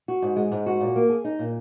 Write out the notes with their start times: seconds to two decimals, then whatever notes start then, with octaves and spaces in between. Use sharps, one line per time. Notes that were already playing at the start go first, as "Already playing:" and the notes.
0.08 F#4
0.22 G#2
0.36 G#3
0.52 G#2
0.66 F#4
0.81 A#2
0.96 A#3
1.10 G#4
1.24 D#4
1.39 A#2